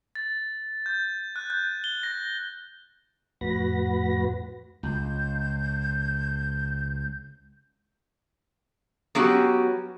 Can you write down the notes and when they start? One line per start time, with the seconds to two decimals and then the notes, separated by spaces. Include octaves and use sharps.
0.15 A6
0.86 G6
1.36 F#6
1.50 G6
1.84 G7
2.03 A#6
3.41 F2 A2 F#4 B4 B5 A#6
4.83 C#2 G6
9.15 F#3 B3 C#4 F#4 G4